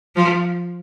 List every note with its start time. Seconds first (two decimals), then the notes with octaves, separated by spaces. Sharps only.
0.16 F3